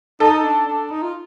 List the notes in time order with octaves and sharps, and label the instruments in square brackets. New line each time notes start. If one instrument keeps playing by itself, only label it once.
[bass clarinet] D#4 [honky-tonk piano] A4
[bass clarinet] D4
D4
D#4
F4